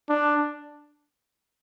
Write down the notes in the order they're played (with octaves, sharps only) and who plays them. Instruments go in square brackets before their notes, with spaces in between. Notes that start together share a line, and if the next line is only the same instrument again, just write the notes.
[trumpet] D4